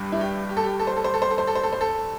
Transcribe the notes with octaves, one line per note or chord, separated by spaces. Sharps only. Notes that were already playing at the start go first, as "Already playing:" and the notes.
Already playing: G2 G3 D4
E4
G4
G4
A4
G4
A4
C5
A4
C5
A4
C5
A4
C5
A4
C5
A4
C5
A4